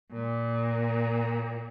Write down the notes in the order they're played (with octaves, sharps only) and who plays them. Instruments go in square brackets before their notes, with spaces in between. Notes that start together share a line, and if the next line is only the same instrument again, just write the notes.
[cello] A#2